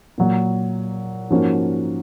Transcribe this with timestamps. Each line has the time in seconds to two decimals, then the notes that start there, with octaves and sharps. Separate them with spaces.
0.18 A#2 F#3 A#3
1.30 G#2 F3 A#3 C#4 F#4